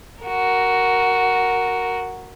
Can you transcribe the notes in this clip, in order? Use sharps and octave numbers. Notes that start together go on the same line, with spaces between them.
F#4 A#4